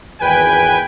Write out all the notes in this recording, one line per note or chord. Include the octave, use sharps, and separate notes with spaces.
G#1 E2 B4 G5 G#5